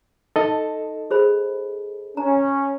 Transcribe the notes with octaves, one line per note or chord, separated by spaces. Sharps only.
D#4 A4 D#5
G#4 C5 B5
C#4 A#5